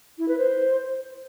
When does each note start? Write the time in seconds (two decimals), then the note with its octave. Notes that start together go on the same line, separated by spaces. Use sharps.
0.19 E4
0.28 B4
0.38 C5